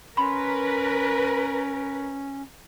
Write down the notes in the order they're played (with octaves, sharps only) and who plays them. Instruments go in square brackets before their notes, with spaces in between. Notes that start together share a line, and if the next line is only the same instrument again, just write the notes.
[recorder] C#4 [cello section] A#4 B4 [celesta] B5 C6